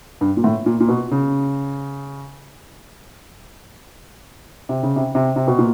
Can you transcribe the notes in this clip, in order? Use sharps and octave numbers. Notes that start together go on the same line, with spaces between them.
G2
A#2
A2
A#2
A#2
B2
C#3
C3
C#3
C3
C3
C3
B2
A#2